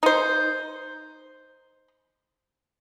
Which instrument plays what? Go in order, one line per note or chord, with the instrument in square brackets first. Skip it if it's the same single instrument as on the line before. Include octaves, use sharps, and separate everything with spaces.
[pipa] D#4 C5